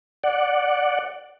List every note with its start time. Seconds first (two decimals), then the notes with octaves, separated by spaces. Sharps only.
0.24 D5 F#5